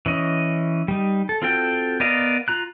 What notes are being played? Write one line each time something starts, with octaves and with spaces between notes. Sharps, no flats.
E3 C#4 D#5
G3 D#4
A4
C4 F4 F#4 A4 G5
B3 A#4 D5 D#5 F5
F4 A#5 F#6